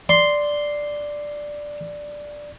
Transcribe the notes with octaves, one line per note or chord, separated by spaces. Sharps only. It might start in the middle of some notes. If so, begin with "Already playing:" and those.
D5 C6